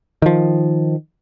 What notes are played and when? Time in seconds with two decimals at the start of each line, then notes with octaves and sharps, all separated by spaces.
0.22 D#3 F3